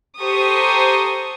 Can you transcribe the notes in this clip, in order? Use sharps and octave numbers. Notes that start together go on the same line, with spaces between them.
G4 A4 C5 A#5 C#6 D#6